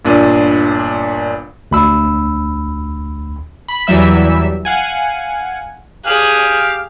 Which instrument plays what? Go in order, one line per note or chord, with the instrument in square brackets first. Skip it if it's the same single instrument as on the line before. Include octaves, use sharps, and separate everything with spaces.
[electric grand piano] G1 A#2 D4 D#7
[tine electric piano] D2 B5 E6
[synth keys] B5
E2 E3 F#3 G3 E5 E6
F5 F#5 G#5
[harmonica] G4 F5 [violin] G#4 F#6